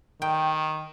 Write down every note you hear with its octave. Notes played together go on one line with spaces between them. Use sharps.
D#3 G5